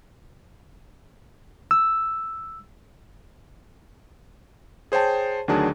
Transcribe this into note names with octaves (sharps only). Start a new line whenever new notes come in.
E6
G#4 C5 C#5 G5 A5
D2 D#3 F#3 D4 G#4 A5